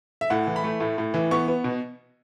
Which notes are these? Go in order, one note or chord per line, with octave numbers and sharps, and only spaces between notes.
E5
A2 F#5
E3
B5
A3
A2
A2
E3
B3 C#6
B3
B2